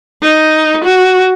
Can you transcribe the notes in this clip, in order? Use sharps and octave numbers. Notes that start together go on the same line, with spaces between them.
D#4
F#4